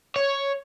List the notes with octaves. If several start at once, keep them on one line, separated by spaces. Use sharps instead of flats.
C#5